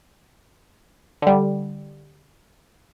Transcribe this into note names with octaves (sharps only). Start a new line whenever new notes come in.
D3 G3